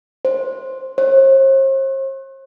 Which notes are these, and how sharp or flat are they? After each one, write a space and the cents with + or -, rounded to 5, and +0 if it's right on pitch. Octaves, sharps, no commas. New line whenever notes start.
C5 +5
C5 +45